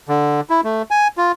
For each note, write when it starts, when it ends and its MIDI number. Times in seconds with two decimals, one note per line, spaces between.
0.09 0.41 50
0.50 0.61 64
0.64 0.82 57
0.91 1.08 80
1.17 1.32 65